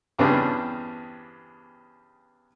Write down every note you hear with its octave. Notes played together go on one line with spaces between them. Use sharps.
E2 G2 C#3 B3 C4 D4